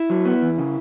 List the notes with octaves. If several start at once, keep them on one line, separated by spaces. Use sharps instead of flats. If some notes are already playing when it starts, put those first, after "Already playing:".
Already playing: E4
F#3
B3
E2
C#3